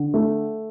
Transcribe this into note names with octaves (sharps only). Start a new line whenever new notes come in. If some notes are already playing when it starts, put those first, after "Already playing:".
Already playing: D3
A3